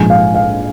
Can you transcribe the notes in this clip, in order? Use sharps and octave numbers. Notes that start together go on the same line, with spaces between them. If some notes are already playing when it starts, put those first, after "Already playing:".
Already playing: A#1 G#2 F3 G#3 G#5
F5
F5